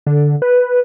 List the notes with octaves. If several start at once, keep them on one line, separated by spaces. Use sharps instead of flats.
D3
B4